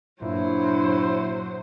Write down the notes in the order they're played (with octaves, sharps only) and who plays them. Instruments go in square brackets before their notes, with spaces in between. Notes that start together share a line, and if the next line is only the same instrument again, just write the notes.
[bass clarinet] G2 [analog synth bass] A#2 [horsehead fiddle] F#3 C5 [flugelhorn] E4